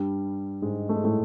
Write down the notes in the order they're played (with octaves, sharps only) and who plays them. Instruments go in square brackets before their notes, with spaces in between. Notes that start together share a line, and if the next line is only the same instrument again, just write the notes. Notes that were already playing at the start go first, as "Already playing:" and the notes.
Already playing: [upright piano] G2 G3
G#2 G#3
A3
G#3
A2 A3